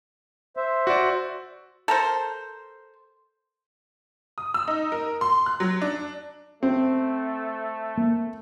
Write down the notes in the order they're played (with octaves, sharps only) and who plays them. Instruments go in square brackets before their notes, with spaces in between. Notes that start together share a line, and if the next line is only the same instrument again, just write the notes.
[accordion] C5 E5
[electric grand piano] F#4 D5
[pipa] A4 A#4 C5
[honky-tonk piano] D#6
E6
D#4
A#4
C6
F#6
F#3
D4
[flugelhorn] A3 [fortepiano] C4
[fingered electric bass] A#3